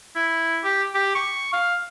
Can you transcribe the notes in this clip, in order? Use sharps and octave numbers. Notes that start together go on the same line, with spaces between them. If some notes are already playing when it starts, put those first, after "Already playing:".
E4
G4
G4
C#6
F5